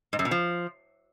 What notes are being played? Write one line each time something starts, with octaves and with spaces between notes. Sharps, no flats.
G#2
F#2
B2
F3